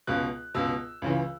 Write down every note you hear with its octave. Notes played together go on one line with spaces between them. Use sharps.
C#2 B2 F#6
C#2 B2 E6
C#2 C#3 E3